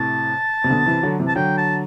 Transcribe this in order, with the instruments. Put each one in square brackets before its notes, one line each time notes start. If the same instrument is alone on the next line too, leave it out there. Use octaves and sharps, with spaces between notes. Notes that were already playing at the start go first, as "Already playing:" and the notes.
Already playing: [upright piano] A2 C3 [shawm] A5
[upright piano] C3
B2 D3
C3 E3
D3 F#3
C3 E3
[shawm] A5
[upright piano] D3 F#3 [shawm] G5
[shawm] A5